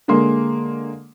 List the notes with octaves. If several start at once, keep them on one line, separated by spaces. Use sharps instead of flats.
D3 G#3 A#3 C6